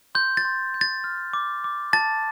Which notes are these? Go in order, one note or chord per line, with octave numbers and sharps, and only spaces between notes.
C6 G6
A6
C6
G6
A6
F6
D6
D6
A5 A6